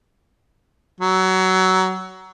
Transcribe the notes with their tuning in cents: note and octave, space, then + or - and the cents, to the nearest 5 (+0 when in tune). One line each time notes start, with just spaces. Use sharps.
F#3 +20